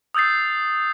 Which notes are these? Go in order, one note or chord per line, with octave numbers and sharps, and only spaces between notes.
D#6 E6 G6 A6 C7